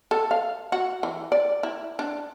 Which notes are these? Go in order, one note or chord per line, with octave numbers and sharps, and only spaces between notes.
A4
F5
F#4
E3
D5
E4
D4